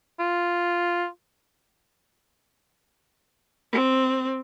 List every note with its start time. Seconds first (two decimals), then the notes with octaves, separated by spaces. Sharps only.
0.19 F4
3.72 C4